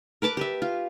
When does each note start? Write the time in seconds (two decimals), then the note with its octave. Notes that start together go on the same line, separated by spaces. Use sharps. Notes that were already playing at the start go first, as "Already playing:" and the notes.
0.22 A#4 B4 A5 D6
0.37 G4 B4 E5
0.62 F4